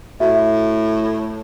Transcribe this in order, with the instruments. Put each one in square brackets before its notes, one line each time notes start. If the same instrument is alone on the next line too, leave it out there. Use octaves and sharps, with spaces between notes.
[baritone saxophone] A2 [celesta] F#4 E5